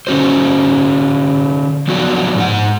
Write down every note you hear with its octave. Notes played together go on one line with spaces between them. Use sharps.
D3 C#4 F#4 C5
F3 F#3 B3 D4 F#4
G#2 G#4 F#5